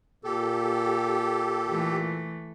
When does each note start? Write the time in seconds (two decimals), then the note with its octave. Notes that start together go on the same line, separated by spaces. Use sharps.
0.24 A#2 G4 A4
1.67 E3 A3